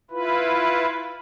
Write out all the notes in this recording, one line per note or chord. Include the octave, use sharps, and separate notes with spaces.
E4 F4 B4